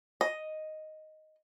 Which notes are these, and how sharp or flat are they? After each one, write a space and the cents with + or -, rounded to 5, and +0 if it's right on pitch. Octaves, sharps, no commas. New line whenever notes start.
D#5 +0